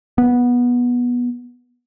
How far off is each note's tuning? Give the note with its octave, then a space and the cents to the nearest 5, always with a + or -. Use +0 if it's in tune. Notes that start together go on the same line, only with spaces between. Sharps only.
B3 -15